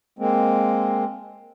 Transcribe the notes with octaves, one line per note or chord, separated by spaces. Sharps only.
G#3 A#3 C4